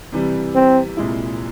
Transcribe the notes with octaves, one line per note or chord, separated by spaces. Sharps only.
C3 E3 G3
C4
C2 A#2 G#3 E4